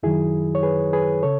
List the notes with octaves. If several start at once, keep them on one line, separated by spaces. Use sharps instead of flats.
F#2 D#3 F#3 E4 G#4
C#5
G#4 B4
G#4 B4
C#3 A4 C#5